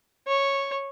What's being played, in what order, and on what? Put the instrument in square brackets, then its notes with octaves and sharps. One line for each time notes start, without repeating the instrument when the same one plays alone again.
[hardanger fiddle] C#5